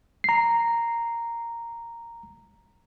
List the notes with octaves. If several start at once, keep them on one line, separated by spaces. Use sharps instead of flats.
A#5 C7